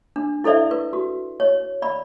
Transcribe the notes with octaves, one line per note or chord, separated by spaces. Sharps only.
D4
E4 A4 C5 D5 E5
B4
F#4
C#5
D5 B5